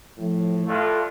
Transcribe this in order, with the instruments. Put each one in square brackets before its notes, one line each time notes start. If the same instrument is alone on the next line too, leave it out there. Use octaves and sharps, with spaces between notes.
[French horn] A2 [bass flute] F3
[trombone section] G2 A3 F4 [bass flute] A4